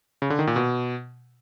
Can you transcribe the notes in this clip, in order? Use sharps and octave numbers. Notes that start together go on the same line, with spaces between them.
C#3
D3
D#3
A#2
B2